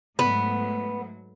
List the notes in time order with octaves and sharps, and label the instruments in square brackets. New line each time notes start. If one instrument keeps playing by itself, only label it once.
[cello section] G#2 F#3 A3 [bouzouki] B3